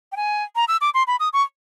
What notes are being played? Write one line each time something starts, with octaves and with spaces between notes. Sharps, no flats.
G5
G#5
A#5
E6
D6
C6
B5
D#6
C#6